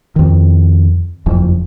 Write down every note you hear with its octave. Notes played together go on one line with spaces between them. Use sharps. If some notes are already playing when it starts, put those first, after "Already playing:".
F2 D#3
F#1 F2